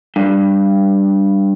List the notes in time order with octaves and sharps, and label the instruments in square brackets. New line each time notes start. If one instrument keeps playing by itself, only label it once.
[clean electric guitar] G2